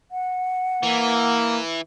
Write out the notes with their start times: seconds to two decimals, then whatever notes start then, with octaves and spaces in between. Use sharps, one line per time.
0.11 F#5
0.83 E3 A#3